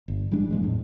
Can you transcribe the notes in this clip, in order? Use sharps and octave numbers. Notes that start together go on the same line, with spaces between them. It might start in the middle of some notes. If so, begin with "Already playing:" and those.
G1
A1 G3 G#3 D4
A#2 F3 G#3
E2 A2